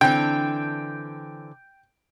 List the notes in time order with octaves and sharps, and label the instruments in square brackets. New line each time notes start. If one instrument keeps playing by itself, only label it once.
[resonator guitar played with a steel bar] D3 E3 C4 [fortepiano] G5